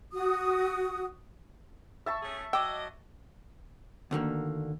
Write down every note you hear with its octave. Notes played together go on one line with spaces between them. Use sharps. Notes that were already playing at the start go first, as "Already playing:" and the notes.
F#4 D#6
E5 A5 C#6
A3 C#4 G#4
F#3 D#5 G5 D6 E6
D2 D3 D#3 A#3